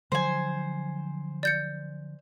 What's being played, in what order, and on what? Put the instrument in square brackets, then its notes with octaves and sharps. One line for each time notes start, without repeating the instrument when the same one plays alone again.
[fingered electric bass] D3 F3 F#3 [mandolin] C5 G#5
[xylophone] D5 G6 C#7